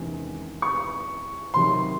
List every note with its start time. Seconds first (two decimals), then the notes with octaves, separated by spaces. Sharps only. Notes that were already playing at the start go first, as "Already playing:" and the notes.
Already playing: E2 C3 D#3 G#3 C#4
0.62 C#6
1.54 C3 D#3 F#3 C6